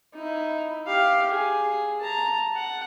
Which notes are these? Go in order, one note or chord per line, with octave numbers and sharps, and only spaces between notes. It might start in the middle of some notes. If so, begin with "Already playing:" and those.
D#4 E4
G4 F5
G#4
A5 A#5
F#5